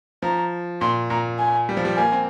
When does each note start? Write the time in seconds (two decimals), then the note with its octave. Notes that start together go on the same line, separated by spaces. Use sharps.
0.22 F3 A#5
0.81 A#2 C6
1.10 A#2 A#5
1.39 G#5
1.69 G3
1.77 F3
1.85 G3
1.97 A#3 G#5
2.12 C4